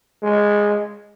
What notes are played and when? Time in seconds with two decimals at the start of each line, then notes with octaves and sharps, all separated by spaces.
0.23 G#3